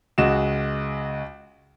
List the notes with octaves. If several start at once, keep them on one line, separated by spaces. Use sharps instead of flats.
C#2 G#3 F#4 E7